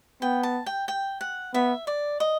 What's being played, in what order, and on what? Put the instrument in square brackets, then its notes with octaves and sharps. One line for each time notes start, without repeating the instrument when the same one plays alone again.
[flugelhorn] B3 [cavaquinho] G5
[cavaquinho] A5
G5
G5
F#5
[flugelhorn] B3 [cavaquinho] E5
[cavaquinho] D5
D#5